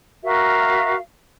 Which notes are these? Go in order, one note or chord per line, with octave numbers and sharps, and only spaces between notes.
F#4 A#4 E5 F5